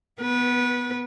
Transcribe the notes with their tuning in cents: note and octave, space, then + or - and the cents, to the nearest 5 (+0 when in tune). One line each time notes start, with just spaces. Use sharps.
B3 +0 B4 -25